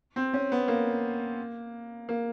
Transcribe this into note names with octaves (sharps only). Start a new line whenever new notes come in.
C4
C#4
B3
A#3
A#3